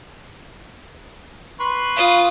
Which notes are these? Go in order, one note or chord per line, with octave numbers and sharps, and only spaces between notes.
B4 C6 C#6
F4 D#6